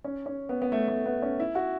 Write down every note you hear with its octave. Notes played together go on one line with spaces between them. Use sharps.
C#4
C#4
B3
B3
A3
A3
B3
C#4
E4
F#4